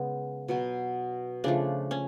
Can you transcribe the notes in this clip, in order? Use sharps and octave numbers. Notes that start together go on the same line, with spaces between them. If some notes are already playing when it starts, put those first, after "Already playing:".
Already playing: C#3 G#3 B3
B2 F#3 B3
C#3 F3 A3 D4
C#4